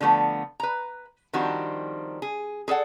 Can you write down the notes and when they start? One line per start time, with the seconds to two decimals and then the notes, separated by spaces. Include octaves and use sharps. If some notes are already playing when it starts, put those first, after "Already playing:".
0.01 D3 F3 A3 B3
0.60 B4 A#5
1.33 D#3 F3 G3 C4 D4 F#4
2.22 G#4
2.68 G#4 A4 D5 F#5